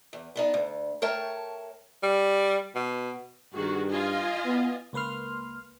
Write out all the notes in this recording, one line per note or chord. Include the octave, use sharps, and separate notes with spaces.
E2
B3 D4 D#4
D2
A3 A#4 C#5 G5 A5
G3
B2
G2 D#3 F#4 G#4
F4 D#5 G#5
B3
C#2 A#3 B4 C6 F6